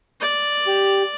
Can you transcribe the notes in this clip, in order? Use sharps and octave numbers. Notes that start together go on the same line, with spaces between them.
D5
G4